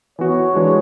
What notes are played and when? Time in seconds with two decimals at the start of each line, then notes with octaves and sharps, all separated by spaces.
0.19 E3 B3 F#4 C#5
0.54 E3 G#3 D4 F#4